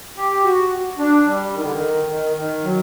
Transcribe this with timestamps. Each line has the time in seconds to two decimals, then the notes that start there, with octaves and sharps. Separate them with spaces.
0.16 G4
0.44 F#4
0.99 D4
1.26 G3
1.53 D#3
1.63 D3
1.72 D#3
2.09 D#3
2.36 D#3
2.64 F#3